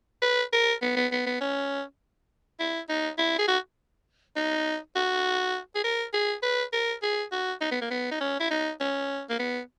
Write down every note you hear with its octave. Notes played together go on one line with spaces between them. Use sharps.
B4
A#4
B3
B3
B3
B3
C#4
E4
D#4
E4
G#4
F#4
D#4
F#4
G#4
A#4
G#4
B4
A#4
G#4
F#4
D#4
B3
A#3
B3
D#4
C#4
E4
D#4
C#4
A#3
B3